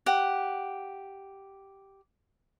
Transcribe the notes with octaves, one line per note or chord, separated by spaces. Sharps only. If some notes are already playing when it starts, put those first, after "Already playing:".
G4 F#5